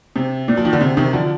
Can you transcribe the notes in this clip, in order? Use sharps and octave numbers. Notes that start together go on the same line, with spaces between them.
C3
A#2
F3
D#3
D3
C3
C3 D#3
D3 F3